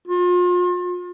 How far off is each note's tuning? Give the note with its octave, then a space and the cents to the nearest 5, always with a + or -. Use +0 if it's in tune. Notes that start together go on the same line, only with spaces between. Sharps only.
F4 +35